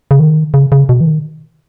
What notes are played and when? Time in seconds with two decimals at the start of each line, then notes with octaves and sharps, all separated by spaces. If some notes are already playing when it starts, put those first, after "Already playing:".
0.11 C#3
0.20 D#3
0.54 C#3
0.72 C#3
0.89 B2
1.01 E3
1.06 D#3